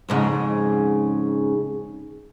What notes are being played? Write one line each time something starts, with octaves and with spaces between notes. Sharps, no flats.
F2 G#2 C#3